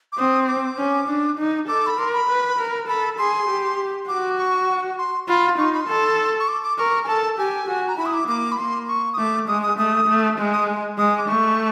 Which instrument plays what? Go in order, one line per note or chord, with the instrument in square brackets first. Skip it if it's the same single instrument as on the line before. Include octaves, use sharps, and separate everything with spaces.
[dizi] D6
[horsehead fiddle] C4 [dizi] D#6
[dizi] D6
[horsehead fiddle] C#4
D4
D#4
[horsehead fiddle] A4 [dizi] D6
[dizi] B5
[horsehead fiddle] A#4 [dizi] C6
[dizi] B5
[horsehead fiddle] B4
A#4
[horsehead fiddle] A4 [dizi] B5
[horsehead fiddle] G#4 [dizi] C6
[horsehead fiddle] G4
[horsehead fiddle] F#4 [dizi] D6
[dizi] C#6
C6
[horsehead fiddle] F4 [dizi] B5
[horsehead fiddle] D#4 [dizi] C#6
[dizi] C6
B5
C6
[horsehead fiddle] A4
[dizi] C#6
D6
D6
[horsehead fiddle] A#4 [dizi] C#6
[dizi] G#5
[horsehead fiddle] A4 [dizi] A5
[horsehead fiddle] G4 [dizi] G#5
[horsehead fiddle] F#4
[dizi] A#5
[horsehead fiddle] E4 [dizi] B5
[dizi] D#6
D6
[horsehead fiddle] A#3 [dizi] D6
[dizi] B5
[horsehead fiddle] A#3 [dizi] C6
[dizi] C#6
D#6
[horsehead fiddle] A3 [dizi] D6
[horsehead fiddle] G#3 [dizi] D#6
[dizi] D#6
[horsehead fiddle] A3 [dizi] D#6
[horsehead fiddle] A3
G#3
[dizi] D#6
[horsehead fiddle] G#3 [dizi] D#6
[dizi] D6
[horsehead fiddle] A3 [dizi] C#6